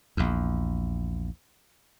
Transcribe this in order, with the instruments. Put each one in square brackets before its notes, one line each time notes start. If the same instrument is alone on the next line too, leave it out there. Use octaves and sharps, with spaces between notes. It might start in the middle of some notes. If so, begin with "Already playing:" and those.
[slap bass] A#1 E2